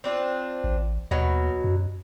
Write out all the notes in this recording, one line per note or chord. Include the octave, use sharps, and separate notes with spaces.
C4 D4 F4
A1
D#2 B2 F#3
F#2